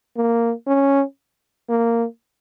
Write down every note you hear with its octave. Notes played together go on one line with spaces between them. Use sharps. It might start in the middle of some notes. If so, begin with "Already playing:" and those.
A#3
C#4
A#3